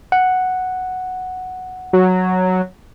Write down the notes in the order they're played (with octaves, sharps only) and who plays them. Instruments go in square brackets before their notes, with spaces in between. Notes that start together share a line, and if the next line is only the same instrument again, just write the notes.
[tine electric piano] F#5
[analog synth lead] F#3